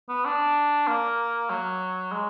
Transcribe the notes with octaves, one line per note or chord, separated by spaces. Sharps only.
B3
D4
A#3
F#3
G#3